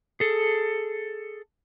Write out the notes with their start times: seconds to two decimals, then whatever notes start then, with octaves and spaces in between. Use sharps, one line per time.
0.20 G#4 A4